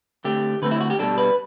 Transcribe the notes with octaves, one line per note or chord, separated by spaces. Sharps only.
D3 A3 C4 G4
D3 A3 C4 B4
E4
F#4
G4
B2 G3 D4 A4
B4